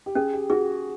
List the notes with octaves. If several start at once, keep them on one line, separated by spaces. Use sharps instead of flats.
G4
C#4 G#4
G4
F#4 G#4